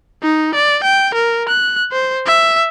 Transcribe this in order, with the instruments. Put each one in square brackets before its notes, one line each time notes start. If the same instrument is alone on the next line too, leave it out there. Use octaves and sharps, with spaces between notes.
[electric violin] D#4
D5
G5
A#4
F#6
C5
E5